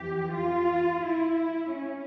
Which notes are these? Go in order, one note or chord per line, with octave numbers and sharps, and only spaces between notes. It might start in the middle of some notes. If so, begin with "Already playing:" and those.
Already playing: F2 E3 G4
F4
E4
C#4